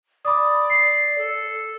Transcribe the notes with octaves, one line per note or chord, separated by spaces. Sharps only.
D5 B5 D6 D#6
C7
A4